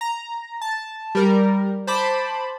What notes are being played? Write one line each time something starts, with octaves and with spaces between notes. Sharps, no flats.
A#5
A5
G3 A#4
C5 A5 B5 D6